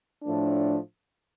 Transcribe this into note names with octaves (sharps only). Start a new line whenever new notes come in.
A2 F3 A3 D4